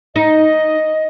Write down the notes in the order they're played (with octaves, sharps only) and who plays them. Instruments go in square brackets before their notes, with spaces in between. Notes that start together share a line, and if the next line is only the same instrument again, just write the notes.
[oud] D#4 [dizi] D#5